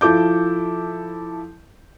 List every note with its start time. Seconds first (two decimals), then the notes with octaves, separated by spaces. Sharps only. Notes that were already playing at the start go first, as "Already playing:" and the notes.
0.01 F3 E4 A4 D6 G6